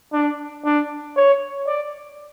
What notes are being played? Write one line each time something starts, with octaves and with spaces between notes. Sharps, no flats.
D4
D4
C#5
D5